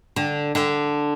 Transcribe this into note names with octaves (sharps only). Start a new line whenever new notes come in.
D3
D3